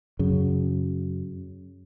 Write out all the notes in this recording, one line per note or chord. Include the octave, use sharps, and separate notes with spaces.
F#2 C#3